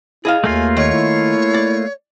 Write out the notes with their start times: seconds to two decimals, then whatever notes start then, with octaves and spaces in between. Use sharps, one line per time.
0.25 E4 G#4 D#5 F5
0.44 D#2 A3 A#3 F4 G#5
0.77 D#3 C#5
0.93 E4
1.54 D5